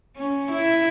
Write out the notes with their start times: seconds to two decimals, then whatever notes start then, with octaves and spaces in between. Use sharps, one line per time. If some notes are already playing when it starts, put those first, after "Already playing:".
0.17 C#4
0.51 E4